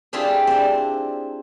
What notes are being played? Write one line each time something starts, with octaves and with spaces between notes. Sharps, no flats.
C4 D4 E4 F4 G4 G#4
C4 D4